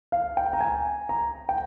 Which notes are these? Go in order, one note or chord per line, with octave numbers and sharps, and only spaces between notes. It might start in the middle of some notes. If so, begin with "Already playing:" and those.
F5
G5
A#5
G#5
A#5
G5